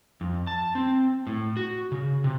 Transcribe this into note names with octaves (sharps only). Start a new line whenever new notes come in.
F2
A5
C4
A2
F#4
C#3
C3